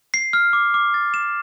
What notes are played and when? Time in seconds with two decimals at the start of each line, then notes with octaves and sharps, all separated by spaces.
0.14 C7
0.33 F6
0.53 D6
0.74 D6
0.94 A6
1.14 E7